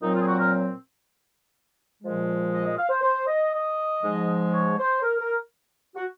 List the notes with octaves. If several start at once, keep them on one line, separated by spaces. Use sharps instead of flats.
A#2 F#3 C4 D#4
F4
G#4
F#4
A#4
A#2 F3 G#3
D#5
D#5
F5
C5
C5
D#5
D#5
G#2 F3 G#3
C#5
C5
A#4
A#4
F#4